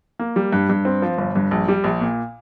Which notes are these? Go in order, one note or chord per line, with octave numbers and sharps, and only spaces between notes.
A#3
G3
G2
G2
C4
F3
G1
G2
A#1
G3
A#1
A#2